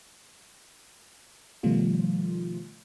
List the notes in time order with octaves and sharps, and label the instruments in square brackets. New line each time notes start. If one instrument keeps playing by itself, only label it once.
[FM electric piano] B2 D#3 F3 G3 A3 F4